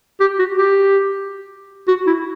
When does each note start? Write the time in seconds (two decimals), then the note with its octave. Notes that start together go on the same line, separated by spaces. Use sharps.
0.21 G4
0.39 F#4
0.58 G4
1.88 F#4
2.07 E4